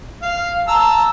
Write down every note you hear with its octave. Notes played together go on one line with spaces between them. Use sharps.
F5
A5 A#5 E6